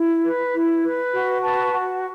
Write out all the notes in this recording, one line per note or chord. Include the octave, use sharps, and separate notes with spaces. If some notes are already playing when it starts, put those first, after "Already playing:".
Already playing: E4
B4
E4
B4
F#4
B4 A5 C#6
F#4